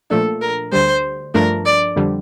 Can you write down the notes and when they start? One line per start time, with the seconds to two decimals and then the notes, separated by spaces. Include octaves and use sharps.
0.10 A#2 F3 A3 D4 A4
0.42 A#4
0.72 D2 D3 G3 C5
1.34 G2 F3 A3 D4 A#4
1.66 D5
1.96 F2 D3 G3